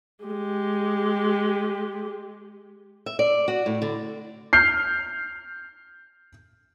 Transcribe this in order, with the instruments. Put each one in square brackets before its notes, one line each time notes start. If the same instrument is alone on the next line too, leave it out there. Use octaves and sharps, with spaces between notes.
[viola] G#3 G4
[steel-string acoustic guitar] E5
D5
F#4
A2
D3
[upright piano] F6 G6 C7